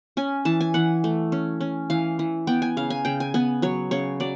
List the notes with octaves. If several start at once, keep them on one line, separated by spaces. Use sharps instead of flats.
C#4 G#5
E3 A5
G#5
E3 F#5
A3
C#4
C#4
E3 F5
E3
B3 G5
G#5
C#3 F5
G#5
C#3 G5
G#5
B3 G#5
F#3 C#5
C#3 C#5
F#3 D5